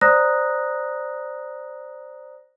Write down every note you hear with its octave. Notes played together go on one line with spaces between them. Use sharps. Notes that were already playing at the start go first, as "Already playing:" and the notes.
C5 D5 A#5 D#6 F#6 A#6